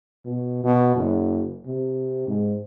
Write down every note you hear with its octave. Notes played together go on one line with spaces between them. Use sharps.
B2
B2
F#1
C3
G#2